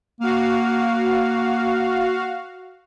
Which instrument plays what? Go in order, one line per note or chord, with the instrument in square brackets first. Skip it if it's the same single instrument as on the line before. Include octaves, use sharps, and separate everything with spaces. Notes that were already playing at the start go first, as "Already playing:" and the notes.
[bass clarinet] A#3 [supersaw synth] F#4 F5